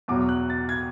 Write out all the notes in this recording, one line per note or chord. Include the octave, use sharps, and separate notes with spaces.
E2 B2 F#3 D6
F#6
A6
G#6